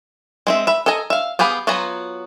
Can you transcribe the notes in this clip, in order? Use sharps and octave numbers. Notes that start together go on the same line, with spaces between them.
G#3 C4 E5
E5 B5
A4 D#5 G#5 A#5
E5 F5
B3 G4 G#4 F5 B5
F#3 B3 F4 G#5 A#5